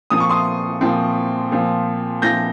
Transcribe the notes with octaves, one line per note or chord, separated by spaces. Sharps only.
A#2 F3 C4 D#6
C#6
C6 D#6
A#2 F3 C4
A#2 F3 C4
A#2 F3 C4 G6 A#6